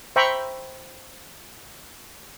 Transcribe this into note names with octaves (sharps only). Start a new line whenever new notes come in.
C5 E5 G5 A#5 B5 C#6